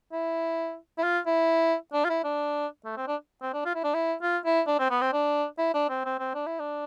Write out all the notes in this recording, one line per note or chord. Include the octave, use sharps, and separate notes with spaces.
E4
E4
F4
E4
D4
F4
E4
D4
A3
C4
D4
C4
D4
F4
E4
D4
E4
F4
E4
D4
C4
B3
C4
D4
E4
D4
C4
C4
C4
D4
E4
D4